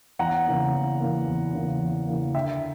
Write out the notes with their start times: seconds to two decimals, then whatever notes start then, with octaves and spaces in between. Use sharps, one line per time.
0.19 E2 F#5 A#5
0.46 C#3 E3 A#3
0.73 E2
1.00 C#3 E3 A#3
1.27 E2
1.54 C#3 E3 A#3
1.81 E2
2.07 C#3 E3 A#3
2.35 D3 E5 G5